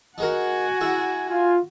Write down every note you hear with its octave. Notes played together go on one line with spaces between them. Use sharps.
D#4 F#4 G#4 A#4 F#5 G#5
E4 G#4 E5
F4 G#5